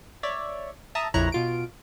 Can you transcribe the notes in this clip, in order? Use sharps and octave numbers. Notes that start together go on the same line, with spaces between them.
C#5 D5 E5
E5 A5 A#5 D#6
A#1 F2 E4 C#5 A#5 F#6
B2 F4 D7